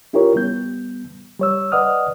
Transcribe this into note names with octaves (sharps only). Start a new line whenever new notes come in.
C#4 E4 F4 G4 A#4 C#5
G3 B3 G6
G3 C#5 E6
B4 D5 D#5 F#5 D#6 F6